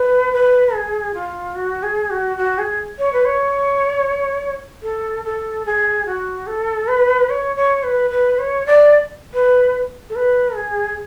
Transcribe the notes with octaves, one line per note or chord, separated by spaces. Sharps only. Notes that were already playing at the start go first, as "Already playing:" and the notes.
Already playing: B4
B4
G#4
F4
F#4
G#4
F#4
F#4
G#4
C#5
B4
C#5
A4
A4
G#4
F#4
A4
B4
C#5
C#5
B4
B4
C#5
D5
B4
A4
B4
G#4